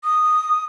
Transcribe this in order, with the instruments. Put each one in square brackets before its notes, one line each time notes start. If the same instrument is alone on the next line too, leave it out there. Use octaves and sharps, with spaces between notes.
[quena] D#6